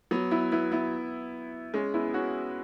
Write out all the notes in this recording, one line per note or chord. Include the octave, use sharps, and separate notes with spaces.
F#3 B3
B3 E4
B3 E4
B3 E4
G#3 C#4
B3 E4
C#4 F#4